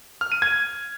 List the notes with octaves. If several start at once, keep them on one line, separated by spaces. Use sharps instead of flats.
F6
D#7
G#6